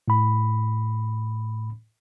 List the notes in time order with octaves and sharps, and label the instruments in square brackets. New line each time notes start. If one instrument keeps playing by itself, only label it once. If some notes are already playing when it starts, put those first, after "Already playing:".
[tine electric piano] A2 B5